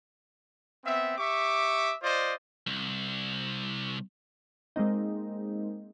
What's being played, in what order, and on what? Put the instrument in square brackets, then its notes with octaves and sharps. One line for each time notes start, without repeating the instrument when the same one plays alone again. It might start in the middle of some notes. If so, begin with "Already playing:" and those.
[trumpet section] B3 C4 E5
G4 E5 C#6 D6
F4 C5 D5 D#5
[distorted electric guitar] C2
[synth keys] G#3 A#3 C4 D#4